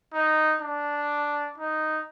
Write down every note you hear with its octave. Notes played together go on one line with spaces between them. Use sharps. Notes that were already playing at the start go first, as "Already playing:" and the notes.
D#4
D4
D#4